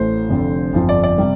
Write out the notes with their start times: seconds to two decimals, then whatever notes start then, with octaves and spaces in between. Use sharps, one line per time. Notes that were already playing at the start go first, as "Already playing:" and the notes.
Already playing: A1 A2 A3 C5
0.29 F1 F2 D3
0.73 G1 F2 F3
0.89 D5
1.04 D5
1.18 C3 G3